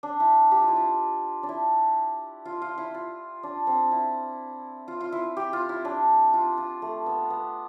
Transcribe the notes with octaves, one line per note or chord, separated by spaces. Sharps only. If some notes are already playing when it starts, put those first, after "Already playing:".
D4
E4
G4
F4
E4
F4
D4
E4
F4
F4
E4
F4
D4
C4
E4
F4
F4
E4
G4
F4
E4
D4
F4
F4
A3
B3
B3